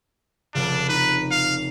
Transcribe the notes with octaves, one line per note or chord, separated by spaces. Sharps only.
F1 C#3 D4
D#4 B4
F5